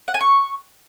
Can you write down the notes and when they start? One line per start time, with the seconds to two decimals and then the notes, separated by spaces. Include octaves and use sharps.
0.08 F#5
0.14 G#5
0.21 C#6